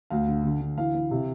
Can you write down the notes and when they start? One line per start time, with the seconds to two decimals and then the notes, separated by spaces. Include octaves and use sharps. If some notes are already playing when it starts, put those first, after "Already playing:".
0.10 D2 F5
0.27 D3
0.44 D3
0.60 D3
0.77 E3 F5
0.94 E3
1.11 C3